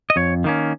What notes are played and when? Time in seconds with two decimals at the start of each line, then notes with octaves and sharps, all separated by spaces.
0.10 D#5
0.16 F2 C#5
0.44 D#3 A#3 C#4